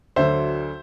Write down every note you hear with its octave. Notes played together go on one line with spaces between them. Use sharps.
D2 D3 F#3 C5 E5